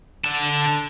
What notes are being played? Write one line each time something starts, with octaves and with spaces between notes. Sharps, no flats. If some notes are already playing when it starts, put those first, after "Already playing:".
D3 A5